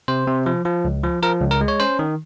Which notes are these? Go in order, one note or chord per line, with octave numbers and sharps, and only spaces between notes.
C3 C5
C3
F3
F3
C#2
F3
F3 A#4
C#2
A#4
G#3
C#5
C#4 C5
D#3